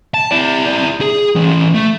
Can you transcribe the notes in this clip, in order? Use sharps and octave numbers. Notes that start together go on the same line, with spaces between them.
A5
E4 D5
G#4
E3 C#4
A3